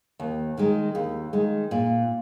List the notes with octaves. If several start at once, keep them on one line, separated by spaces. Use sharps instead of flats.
D#2
D#3 G#3
D#2
D#3 G#3
A#2